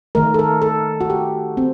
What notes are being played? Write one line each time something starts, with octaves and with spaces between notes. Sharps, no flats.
D#3 A3 A#4
A4
A#4
A4
F#4
G4
C4